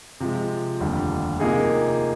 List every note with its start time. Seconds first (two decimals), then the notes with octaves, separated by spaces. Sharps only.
0.20 C3 F3 G#3
0.80 F1 D#2 D3 G3
1.40 C3 F3 A#3 D#4 G#4